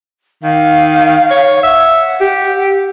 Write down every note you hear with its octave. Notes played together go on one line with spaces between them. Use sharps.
D#3 F5
C#5
E5 F#5
G4